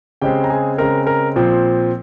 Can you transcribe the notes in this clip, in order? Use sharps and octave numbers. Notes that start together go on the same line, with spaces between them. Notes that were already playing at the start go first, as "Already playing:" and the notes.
C#3 G#3 C4 G4 G5
A#5
G#4 G#5
C#3 G#3 C4 A#4 A#5
A#4 A#5
A#2 F3 C4